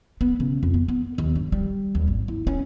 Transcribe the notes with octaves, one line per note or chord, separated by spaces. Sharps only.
B3
C#3
F2
B3
B3
D#2
G2
G3
D#2
G#1
E4
C#4